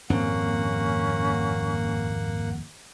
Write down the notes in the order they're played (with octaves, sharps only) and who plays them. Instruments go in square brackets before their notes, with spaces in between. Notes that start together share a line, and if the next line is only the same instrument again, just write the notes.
[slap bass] D#1 F2 C4 [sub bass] G#2 [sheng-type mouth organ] A#3 F#5 [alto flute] C#4